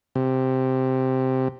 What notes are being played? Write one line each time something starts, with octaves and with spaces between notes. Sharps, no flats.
C3